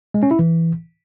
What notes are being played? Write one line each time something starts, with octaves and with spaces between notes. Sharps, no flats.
G#3
C#4
E4
E3